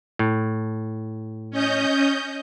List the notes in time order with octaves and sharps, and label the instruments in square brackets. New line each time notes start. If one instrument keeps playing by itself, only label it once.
[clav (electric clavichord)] A2
[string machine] C#4 D#5 G6